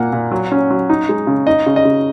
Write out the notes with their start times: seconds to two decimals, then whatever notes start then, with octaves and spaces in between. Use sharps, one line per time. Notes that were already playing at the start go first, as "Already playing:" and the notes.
Already playing: A#2 A#3 F#5
0.13 A#2
0.31 F#3
0.52 C#4
0.71 F#3
0.90 D#4
1.09 G#3
1.27 C#3
1.47 D#4 D#5
1.66 C#3
1.76 D#5
1.85 C#3